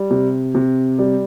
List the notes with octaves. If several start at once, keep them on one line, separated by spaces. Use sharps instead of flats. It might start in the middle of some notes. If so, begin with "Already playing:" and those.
Already playing: G3
C3
C3
G3